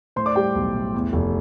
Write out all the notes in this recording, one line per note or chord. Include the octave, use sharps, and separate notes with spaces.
A2 C5 C6
D5 D6
G3 G4 G5
B1
A2
E2
F1